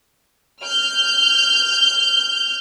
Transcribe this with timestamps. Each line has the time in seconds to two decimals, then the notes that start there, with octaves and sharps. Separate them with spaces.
0.63 F6 G6